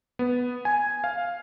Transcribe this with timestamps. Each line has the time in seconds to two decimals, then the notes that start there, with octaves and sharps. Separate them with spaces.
0.19 B3
0.65 G#5
1.04 F5